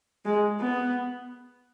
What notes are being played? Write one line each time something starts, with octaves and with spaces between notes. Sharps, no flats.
G#3
B3